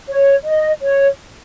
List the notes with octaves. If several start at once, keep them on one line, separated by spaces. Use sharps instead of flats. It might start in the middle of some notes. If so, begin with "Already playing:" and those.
C#5
D#5
C#5